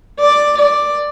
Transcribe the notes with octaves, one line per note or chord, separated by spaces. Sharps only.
D5
D5